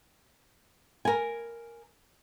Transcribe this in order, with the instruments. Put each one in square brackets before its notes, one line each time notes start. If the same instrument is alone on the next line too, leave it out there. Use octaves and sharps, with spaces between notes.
[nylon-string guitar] A#4 G#5